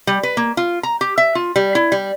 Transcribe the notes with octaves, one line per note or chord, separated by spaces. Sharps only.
G3
B4
A#3
F4
A#5
G4
E5
F4
G3
E4
G3